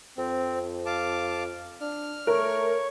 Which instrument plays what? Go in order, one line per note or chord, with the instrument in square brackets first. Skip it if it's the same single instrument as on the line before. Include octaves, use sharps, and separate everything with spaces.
[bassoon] F2 [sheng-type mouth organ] C4
[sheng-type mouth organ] F5 A5 D6
[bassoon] D4 [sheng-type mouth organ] F6
[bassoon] A3 [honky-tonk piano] A#4 [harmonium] C#5